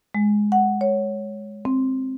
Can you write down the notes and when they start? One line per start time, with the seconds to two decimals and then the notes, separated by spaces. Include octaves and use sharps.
0.15 G#3
0.52 F#5
0.81 C#5
1.65 C4